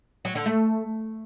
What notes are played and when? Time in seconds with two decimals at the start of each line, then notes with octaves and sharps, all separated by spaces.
0.25 F#3
0.35 D3
0.46 A3